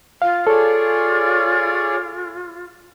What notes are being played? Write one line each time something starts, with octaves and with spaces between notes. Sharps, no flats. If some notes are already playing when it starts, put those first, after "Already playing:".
F4 F5
G#4 A4 C#5 D5